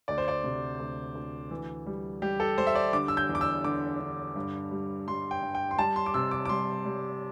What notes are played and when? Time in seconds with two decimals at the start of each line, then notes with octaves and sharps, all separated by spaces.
0.08 D2 D5
0.18 C5
0.28 D5
0.44 C3
0.80 D2
1.15 D2
1.51 E3
1.86 G3
2.22 G3 G4
2.40 A4
2.58 G3 C5
2.67 E5
2.75 D5
2.93 D3 D6
3.08 E6
3.17 G6
3.29 E2
3.35 D6
3.41 E6
3.64 D3 D6
4.00 D3
4.36 G2
4.71 G3
5.07 G3 C6
5.31 G5
5.43 G2
5.55 G5
5.71 C6
5.78 G3 A5
5.96 C6
6.06 D6
6.14 C3 E6
6.31 D6
6.45 D6
6.49 G3 C6
6.85 G3